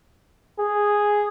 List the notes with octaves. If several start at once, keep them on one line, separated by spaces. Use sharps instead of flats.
G#4